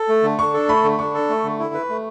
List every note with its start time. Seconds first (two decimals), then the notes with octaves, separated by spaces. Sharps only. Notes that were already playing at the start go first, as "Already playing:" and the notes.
Already playing: A4 A5
0.09 A3
0.23 D3
0.39 D4 C#6
0.54 A4
0.68 A3 B5
0.84 D3
0.99 D4 C#6
1.14 A4
1.29 A3
1.44 D3
1.59 E4
1.74 B4
1.89 A3